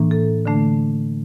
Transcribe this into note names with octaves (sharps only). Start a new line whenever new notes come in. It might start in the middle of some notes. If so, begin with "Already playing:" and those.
Already playing: A2 E3 A#3 D4
A4
D3 A3 D4